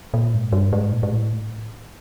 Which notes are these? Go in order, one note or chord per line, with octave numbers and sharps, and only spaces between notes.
A#2
G#2
G2
G#2
A#2
G#2
A2